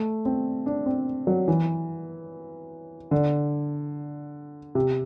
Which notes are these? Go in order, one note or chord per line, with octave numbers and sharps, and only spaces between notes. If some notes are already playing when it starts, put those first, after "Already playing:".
Already playing: A3
C4
D4
C4
F#3
E3
D3
C3